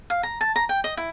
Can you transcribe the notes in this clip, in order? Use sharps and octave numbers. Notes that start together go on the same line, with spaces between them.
F5
A#5
A5
A#5
G5
D#5
E4